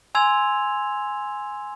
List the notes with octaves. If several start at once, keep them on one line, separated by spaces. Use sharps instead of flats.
G#5 C6 E6 G#6 F7